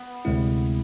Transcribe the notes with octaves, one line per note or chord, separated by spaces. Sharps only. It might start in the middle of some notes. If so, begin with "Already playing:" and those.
Already playing: B3
D2 C3 G#3 C4 E4